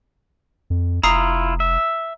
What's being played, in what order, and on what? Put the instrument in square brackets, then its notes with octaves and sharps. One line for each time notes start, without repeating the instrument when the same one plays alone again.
[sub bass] F2
[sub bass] F1 [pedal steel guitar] E4 F4 [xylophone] A#5 D#6 C7
[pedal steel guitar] E5